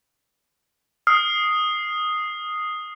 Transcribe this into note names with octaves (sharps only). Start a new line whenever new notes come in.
D#6 F6 C7